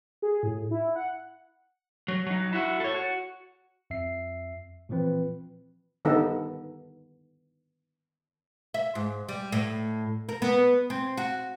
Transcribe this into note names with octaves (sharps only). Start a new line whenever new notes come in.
G#4
A2
E4
F#5
F#3
F#3 D#4
E4 F#4
A4 C#5
F#4
F2 E5 C7
A#2 E3 F3 C4 B4
D3 D#3 G3 B3 D#4 A4
E5
G#2
G3
A2
A#4
B3
C4
F#4